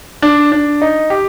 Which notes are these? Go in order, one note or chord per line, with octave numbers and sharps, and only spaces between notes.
D4
D4
D#4
G4